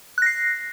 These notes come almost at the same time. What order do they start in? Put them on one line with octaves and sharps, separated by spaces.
F#6 A#6 C7